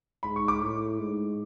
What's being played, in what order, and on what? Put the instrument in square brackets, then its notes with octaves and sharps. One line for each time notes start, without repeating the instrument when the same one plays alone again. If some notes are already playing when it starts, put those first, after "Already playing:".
[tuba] G#2 [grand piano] B5
[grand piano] C#6
D6
[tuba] A2
G#2